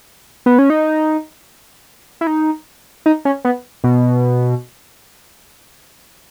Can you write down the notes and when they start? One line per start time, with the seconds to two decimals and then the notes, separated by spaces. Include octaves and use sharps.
0.46 B3
0.59 C#4
0.70 D#4
2.21 E4
2.27 D#4
3.06 D#4
3.25 C#4
3.45 B3
3.84 B2